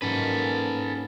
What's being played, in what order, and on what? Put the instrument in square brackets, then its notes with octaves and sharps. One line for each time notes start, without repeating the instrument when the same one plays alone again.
[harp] G#2 F#3 A#3 [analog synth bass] C#4 [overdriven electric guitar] A4 B4